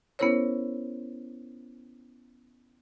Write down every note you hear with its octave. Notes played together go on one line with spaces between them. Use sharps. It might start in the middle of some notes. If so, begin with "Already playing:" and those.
B3 C#4 E4 A#4 C5 C#5